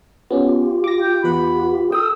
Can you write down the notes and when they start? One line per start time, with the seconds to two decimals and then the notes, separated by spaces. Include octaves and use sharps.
0.31 B3 C#4 F4 G4
0.84 D6 A#6
1.02 G5
1.24 E2 B4 F#5 B5
1.92 A4 G5 D#6 E6